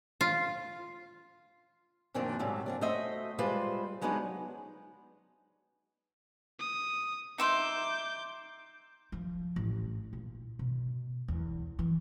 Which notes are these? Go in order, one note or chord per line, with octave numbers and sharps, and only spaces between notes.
F4
F#2 A#2 D#3 F3 C4 D4
G#2 C3 F#3 G3 A3
F3 C4 D4
A3 F#4 C5 D#5 E5
G3 G#3 F4 B4 C5
F#3 G#3 B3 D4 D#4
D#6
D#4 E5 C6 D6 G6
F3
A1
A#2
B2
E2
E3